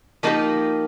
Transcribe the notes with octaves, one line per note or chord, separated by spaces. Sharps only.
F3 A#3 D#4 G4